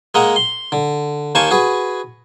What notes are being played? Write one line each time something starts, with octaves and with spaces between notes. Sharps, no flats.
G#3 A#3 D#5 F#5 A#5
C6
D3
D#2 A#3 C5 G#5 A5 C#6
F#4 G#4 B4